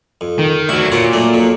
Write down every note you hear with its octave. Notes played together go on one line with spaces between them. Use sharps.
F2
D#3
D2 F#3 E4 C#6
A#2 F4 F#4 C#5
F#3 A3 D4
F2 F#3